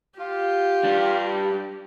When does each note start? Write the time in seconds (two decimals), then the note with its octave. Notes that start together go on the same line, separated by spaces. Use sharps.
0.19 F4 G4
0.84 G3 D4